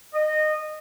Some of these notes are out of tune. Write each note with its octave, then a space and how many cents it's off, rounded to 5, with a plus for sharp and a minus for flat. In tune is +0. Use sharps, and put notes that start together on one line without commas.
D#5 -20